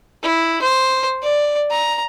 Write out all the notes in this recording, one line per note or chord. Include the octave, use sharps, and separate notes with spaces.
E4
C5
D5
A#5